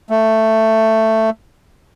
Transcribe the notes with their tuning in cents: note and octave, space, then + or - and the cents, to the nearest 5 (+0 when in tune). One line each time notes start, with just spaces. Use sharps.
A3 +10